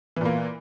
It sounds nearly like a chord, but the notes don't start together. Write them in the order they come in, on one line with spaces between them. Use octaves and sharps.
E3 A#2 A#3